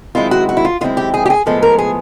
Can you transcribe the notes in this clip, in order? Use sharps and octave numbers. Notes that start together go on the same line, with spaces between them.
F#2 D#3 G#3 C4 E4 F4
F#4
F#4
E4
F4
F#2 D#3 G#3 C4 E4 F4
G4
G#4
G4
G#4
A2 F3 G#3 B3 A4
A#4
G#4